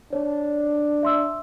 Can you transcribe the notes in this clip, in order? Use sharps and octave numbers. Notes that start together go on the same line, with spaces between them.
D4 C#5
E5 C6 E6